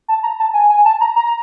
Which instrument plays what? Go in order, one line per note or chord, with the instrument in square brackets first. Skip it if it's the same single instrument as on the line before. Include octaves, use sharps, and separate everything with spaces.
[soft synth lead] A5
A#5
A5
G#5
G#5
A5
A#5
A#5